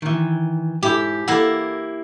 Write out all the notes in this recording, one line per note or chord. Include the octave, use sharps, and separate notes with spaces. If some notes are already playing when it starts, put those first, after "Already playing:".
D#3 E3
G#2 E4 G4
A#3 E4 A4 F#5